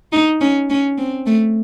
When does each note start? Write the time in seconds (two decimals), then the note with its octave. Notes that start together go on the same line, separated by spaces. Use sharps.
0.12 D#4
0.41 C#4
0.70 C#4
0.98 C4
1.26 A3